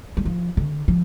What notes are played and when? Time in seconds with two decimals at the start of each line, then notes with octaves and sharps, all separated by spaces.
0.17 G3
0.25 F3
0.57 D3
0.88 F3